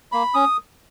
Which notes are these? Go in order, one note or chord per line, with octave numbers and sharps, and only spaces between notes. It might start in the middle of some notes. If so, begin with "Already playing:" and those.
A#3 B5
C#4 D#6